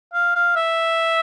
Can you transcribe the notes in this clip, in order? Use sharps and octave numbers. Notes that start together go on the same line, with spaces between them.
F5
F5
E5